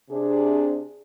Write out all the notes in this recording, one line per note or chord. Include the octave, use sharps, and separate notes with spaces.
C3 D4 G#4